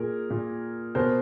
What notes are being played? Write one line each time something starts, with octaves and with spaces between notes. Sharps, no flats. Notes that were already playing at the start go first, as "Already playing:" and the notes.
Already playing: A#2 G#4 A#4
A#2
B2 A#4 C5